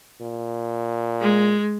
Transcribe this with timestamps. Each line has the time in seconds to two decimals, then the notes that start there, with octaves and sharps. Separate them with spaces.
0.21 A#2
1.21 G#3